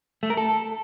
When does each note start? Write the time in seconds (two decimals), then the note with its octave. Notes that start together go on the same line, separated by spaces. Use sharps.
0.23 A3
0.30 A#4
0.37 A4